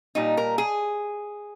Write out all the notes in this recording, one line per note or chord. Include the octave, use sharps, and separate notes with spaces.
A#2 G3 D#4
A#4
G#4